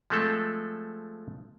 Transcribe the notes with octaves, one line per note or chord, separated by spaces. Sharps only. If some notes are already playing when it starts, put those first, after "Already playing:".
F3 G#3 A3 C4 A4